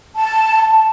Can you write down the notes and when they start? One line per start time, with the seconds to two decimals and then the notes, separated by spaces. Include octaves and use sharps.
0.17 A5